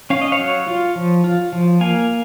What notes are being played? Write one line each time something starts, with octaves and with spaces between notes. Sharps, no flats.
C#4 F5
D#5
C#5 F5
F#3
F4
F3
F4
F3
A#3 F5 G#5